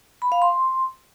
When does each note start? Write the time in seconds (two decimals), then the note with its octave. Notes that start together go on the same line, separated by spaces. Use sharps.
0.22 B5
0.32 F5
0.42 C6